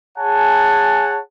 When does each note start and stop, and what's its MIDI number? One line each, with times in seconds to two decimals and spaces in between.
0.18 1.19 68
0.18 1.19 73
0.18 1.19 78
0.18 1.19 80
0.18 1.19 81